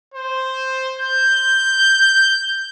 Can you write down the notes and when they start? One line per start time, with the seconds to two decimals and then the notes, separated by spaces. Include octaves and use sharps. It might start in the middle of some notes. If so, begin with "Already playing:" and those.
0.14 C5
0.99 G6